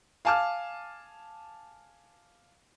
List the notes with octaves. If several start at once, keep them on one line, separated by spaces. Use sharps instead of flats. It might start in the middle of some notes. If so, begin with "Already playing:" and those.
F5 G#5 A5 D6 F6